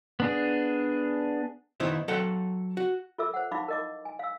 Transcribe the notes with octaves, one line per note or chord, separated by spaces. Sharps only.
B3 D4 G#4
D#3 B3 D#4 E4 C5 E5
F#3 A4 F#5 G5
F#4
F4 A4 A#4 E5 D6 E6
C5 F#5
D#4 E4 F5 B5 C#6 D6
A#4 D#5 D6
G#5
F5 E6